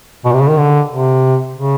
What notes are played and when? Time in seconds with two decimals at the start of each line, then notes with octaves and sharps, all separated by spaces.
0.25 B2
0.33 C3
0.41 C#3
0.49 D#3
0.58 D3
0.91 C3
1.55 C#3